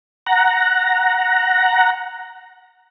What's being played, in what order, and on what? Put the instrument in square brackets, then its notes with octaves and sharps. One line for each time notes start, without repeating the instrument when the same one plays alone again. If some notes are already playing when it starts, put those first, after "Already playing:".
[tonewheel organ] F#5 A#5